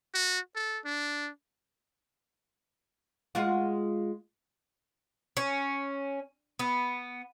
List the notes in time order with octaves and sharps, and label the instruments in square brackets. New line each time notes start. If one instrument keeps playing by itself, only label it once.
[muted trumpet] F#4
A4
D4
[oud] G#3 F4 F#4
[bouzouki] C#4
B3